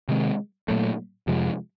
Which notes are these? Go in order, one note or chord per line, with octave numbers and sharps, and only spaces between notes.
C3 D#3 G#3 C4
A#2 F#3 A3
F2 C3 F3 G#3